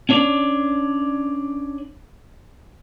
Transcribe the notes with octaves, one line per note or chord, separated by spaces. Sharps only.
C#4 D4 C#5 D5